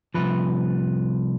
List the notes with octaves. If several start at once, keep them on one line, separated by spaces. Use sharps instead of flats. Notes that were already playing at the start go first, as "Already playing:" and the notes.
C2 A#2 F3 B4